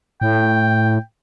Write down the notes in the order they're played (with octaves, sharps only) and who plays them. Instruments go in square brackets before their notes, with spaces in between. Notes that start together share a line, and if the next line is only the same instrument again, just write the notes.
[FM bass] A2 [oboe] G5